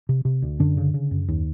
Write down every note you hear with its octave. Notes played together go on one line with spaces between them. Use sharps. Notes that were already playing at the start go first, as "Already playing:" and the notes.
C3
C3
D2
F#2 D3 D4
C#3
C#3
F#2
D#2